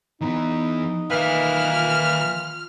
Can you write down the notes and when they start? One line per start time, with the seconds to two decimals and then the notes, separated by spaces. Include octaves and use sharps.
0.21 E3 B3 D#4
1.10 D#3 E3 A#3 B4 E5 F6
1.72 F4